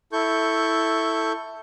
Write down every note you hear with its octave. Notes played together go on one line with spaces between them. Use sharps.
E4 A4 C#6 G6